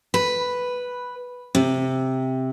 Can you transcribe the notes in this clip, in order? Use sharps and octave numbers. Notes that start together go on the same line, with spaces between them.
B4
C3